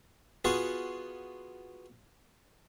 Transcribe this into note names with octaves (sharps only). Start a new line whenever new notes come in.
B3 F4 F#4 G#4